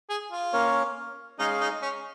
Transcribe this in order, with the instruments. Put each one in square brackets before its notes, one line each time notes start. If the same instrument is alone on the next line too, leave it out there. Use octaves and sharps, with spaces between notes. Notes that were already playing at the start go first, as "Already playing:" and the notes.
[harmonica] G#4
F4
[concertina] A#3 C#4 A#4 C#5
[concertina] G#3 C#4 G#4 F5 G#5 [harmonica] D#4
[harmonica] D#4
C#4